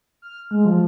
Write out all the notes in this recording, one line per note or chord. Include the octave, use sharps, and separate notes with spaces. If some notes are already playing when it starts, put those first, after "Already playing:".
F6
G#3
F3